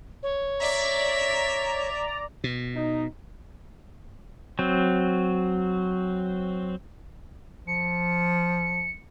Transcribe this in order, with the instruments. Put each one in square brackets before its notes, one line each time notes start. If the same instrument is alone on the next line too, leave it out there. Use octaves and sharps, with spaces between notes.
[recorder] C#5
[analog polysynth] D5 A#5 [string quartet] E5
[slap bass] B2
[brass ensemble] D#4
[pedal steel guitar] F#3 C4
[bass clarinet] F3 [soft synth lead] C#7